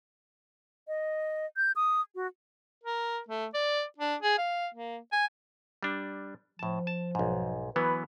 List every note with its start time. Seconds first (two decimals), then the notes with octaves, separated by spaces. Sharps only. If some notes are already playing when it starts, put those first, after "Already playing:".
0.88 D#5
1.57 G6
1.76 D#6
2.15 F#4
2.84 A#4
3.29 A3
3.54 D5
3.98 D4
4.22 G#4
4.38 F5
4.74 A#3
5.12 G#5
5.83 G3 D4
6.59 A2 F3 A5
6.87 A5
7.15 B1 G#2
7.76 E3 F#3 B3 B4